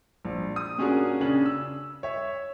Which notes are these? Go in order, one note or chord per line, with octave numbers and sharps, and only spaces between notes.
A#1
D#6
A#2 C#4 D4 F#4 G#4 A#4
C#3 C#4 D4 F#7
E6
C#5 E5